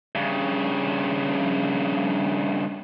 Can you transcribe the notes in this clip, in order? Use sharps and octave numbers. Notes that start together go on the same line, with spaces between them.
G2 C#3